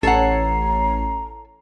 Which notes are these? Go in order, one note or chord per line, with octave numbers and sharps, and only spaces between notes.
A1 A4 C#5 F#5 A#5 C7